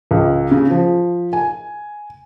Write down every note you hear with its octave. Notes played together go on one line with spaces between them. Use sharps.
C#2
C#3
F3
G#5